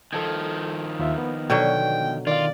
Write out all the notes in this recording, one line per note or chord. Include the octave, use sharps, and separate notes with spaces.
D#3 F3 A4 A5 G#6
D#2 F4 E5
B3
B2 D3 F#3 G5
D#3 F4 D5 F5